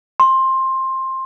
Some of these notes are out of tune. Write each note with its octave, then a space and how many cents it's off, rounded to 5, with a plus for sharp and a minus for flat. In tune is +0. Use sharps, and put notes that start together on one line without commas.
C6 +15